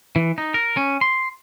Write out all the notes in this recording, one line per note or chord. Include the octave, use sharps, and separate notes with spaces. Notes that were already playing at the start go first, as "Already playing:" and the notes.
E3
D#4
A#4
C#4
C6